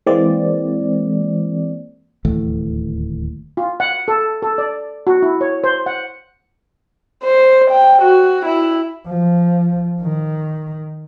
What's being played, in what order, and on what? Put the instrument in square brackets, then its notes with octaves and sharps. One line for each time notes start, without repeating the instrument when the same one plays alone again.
[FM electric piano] E3 G#3 A#3 C4 D5
[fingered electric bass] D1 D#2 E3 A3
[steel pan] F4
F#5
A4
A4
D5
F#4
E4
C#5
C5
F#5
[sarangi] C5
G5
F#4
E4
[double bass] F3
D#3